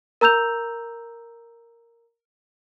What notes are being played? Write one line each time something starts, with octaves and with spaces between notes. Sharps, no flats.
A#4 A#5 E6 G6 F7